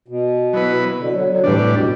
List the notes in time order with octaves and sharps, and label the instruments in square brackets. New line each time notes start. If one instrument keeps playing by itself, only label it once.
[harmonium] B2
[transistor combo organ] F#3 B3 E4 B4
[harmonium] B2 D3
D3 F#3
D3 F#3
[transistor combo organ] A2 G3 D4 [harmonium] C3 E3
[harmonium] B2